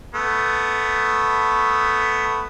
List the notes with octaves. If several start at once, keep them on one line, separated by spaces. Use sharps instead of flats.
A3 B3